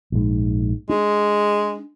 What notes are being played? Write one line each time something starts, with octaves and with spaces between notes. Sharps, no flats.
A#1 G#2
G#3 D4